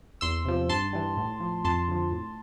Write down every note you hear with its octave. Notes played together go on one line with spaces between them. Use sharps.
E2 C6 E6
C3 F3
G2 A5 C6
E3 G3
A2
F3
F2 A5 C6
D3 F3
A2